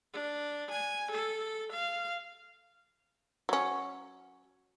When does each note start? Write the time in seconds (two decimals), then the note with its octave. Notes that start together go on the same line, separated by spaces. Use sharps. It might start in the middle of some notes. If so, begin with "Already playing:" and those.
0.14 D4
0.71 G#5
1.11 A4
1.72 F5
3.49 F#3 C#4